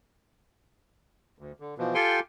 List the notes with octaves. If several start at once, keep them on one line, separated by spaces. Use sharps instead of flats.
D2
D3
B2 E3 F3
F4 G4 A4 G5 G#5 C6